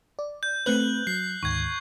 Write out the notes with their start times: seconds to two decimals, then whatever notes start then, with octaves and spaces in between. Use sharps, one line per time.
0.19 D5
0.43 G6
0.66 A3 C4 B4 F#6 F#7
1.07 F#3 C7
1.43 D2 G#2 D#3 C#6 G#6